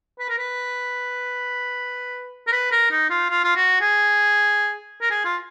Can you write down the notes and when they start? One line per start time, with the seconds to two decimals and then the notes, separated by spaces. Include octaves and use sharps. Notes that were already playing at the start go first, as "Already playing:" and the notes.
0.19 B4
0.29 A#4
0.38 B4
2.47 A#4
2.52 B4
2.72 A#4
2.91 D#4
3.10 F4
3.30 F4
3.44 F4
3.55 F#4
3.81 G#4
5.01 A#4
5.11 G#4
5.25 F4